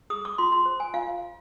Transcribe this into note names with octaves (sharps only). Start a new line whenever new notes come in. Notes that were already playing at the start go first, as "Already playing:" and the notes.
G#4 D#6
D6
F4 C6
C6
C5
G#5
F4 F5